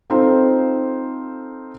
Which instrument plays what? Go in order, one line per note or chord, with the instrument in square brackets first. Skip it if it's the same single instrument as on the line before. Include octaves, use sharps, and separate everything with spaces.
[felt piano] C4 D#4 F4 A4 C5